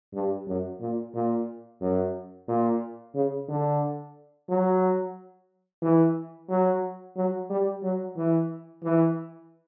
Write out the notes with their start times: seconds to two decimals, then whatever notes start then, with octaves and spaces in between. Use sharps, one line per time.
0.14 G2
0.47 F#2
0.81 A#2
1.14 A#2
1.81 F#2
2.48 A#2
3.15 C#3
3.49 D3
4.49 F#3
5.82 E3
6.49 F#3
7.16 F#3
7.50 G3
7.83 F#3
8.17 E3
8.83 E3